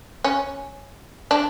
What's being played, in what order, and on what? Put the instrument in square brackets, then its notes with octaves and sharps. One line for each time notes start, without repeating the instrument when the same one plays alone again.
[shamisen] C#4
D4